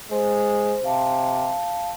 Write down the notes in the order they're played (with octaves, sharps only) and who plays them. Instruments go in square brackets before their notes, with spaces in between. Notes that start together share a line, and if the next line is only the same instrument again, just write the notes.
[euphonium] G#3 [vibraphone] C5
[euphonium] C3 [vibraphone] F5 A5